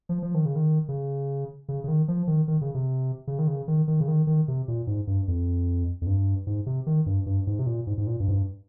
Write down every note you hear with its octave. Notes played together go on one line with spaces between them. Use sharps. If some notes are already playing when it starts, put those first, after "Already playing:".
F3
F3
D#3
C#3
D#3
C#3
C#3
C#3
D#3
F3
D#3
D#3
C#3
C3
C#3
D#3
C#3
D#3
D#3
C#3
D#3
D#3
C3
A#2
G#2
G2
F2
F2
G2
G#2
C3
D#3
G2
G2
G#2
C3
A#2
G#2
G#2
A#2
G2
G#2
G2